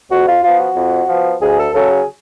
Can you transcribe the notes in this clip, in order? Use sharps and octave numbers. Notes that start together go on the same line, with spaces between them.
F2 F#4
F4
F3 B3 F4
F#4
F2
F3 B3
D2 G#4
A4
C#3 F#3 C#4 A4
G#4